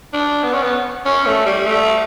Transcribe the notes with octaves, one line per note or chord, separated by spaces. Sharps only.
D4
B3
C#4
B3
C#4
A3
G3
A3